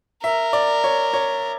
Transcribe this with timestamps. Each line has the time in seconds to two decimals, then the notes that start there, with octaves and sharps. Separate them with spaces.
0.24 A#4 E5
0.53 D5
0.84 C#5
1.13 C#5